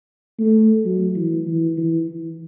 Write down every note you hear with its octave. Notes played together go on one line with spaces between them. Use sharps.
A3
F#3
E3
E3
E3
E3